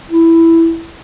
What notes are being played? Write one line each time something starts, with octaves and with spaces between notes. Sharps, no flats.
E4